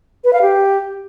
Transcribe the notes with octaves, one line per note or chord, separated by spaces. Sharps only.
B4
F5
G4